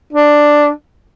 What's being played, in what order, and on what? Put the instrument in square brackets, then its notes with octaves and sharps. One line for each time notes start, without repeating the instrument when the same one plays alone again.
[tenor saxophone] D4